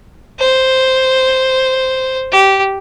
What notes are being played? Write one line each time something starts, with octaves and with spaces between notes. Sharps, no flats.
C5
G4